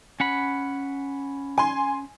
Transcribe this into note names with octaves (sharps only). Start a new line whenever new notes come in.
C#4 F#5 B5
G#5 C6